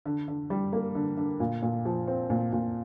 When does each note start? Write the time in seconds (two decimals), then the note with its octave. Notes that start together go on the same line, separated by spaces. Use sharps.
0.06 D3
0.28 D3
0.50 G3
0.73 A#3
0.95 D3
1.17 D3
1.40 A#2
1.62 A#2
1.85 F3
2.08 C4
2.30 A#2
2.52 A#2